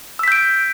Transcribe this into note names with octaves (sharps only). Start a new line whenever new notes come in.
E6 G6 B6 D7